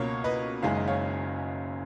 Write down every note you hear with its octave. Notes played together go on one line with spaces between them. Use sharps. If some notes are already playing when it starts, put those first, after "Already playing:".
Already playing: C#2 B2 A#3 C#5
B4 D#5
F#1 F#2 D#3 G#3 F5
D#5
C#5 F5